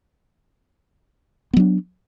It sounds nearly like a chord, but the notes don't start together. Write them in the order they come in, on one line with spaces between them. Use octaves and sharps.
B3 F#3 D4